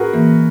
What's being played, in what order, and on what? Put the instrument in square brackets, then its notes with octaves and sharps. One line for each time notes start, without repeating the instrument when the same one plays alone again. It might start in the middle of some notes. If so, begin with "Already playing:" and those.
Already playing: [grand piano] F#4 G#4 A#4 B4
[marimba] E3 A#3